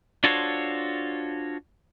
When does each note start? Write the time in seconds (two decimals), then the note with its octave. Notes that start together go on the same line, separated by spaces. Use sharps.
0.24 D4 F4 F#4 A4 C5 C#5